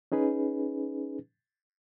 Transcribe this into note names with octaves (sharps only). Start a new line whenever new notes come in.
C#4 D#4 G#4 B4